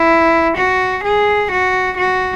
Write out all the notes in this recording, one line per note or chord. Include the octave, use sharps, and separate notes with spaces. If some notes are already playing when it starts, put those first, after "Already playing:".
Already playing: E4
F#4
G#4
F#4
F#4